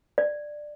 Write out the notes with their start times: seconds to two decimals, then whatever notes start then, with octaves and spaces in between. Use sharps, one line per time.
0.18 D5